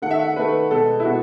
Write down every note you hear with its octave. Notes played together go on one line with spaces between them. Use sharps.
D#3 A3 F#5
E5
F#5
D#3 A3 B4
B2 G#3 B3 A4
E4
B2 G#3 B3 F#4